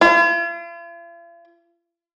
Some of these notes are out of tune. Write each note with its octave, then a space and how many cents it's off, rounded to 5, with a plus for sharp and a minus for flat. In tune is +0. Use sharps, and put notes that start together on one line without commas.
F4 -45